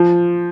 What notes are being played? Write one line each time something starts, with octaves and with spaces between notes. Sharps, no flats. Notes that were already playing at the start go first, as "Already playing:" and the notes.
Already playing: F3